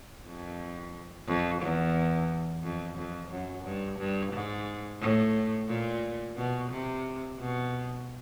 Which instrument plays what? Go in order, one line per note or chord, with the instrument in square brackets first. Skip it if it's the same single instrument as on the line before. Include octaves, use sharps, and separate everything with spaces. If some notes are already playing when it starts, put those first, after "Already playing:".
[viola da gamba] F2
F2
E2
F2
F2
F#2
G2
G2
G#2
A2
A#2
B2
C3
B2